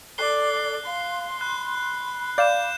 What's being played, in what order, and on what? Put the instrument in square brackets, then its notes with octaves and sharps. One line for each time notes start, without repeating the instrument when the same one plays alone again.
[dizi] A4 [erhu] D5 [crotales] F#6 C7 G7
[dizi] F5 [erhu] C6
[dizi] B5 [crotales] F#6
[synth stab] D5 F5 [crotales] G6 E7